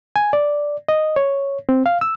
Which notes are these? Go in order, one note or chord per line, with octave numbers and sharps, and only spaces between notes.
G#5
D5
D#5
C#5
C4
F5
E6